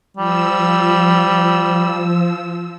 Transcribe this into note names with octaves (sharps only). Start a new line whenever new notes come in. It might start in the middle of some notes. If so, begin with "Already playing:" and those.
F3 G3 E6